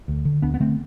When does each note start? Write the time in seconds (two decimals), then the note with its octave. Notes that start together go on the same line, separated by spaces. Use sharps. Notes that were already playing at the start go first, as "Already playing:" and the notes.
0.08 D2
0.25 D3
0.42 D2 B3 D4
0.54 B3
0.60 D3 A3 C4